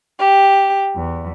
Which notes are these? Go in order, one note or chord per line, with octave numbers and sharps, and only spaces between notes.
G4
E2